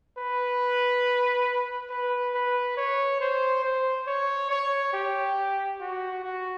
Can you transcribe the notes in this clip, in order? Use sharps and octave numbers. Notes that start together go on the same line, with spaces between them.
B4
B4
B4
C#5
C5
C5
C#5
C#5
G4
F#4
F#4